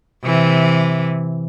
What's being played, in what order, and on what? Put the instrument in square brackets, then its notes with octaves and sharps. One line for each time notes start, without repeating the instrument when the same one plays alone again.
[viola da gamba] C3 E3